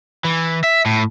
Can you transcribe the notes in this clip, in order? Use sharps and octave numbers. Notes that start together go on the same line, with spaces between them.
E3
E5
A2